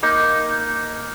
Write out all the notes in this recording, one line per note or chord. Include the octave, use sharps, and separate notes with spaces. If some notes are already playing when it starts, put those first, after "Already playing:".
A#3 D#4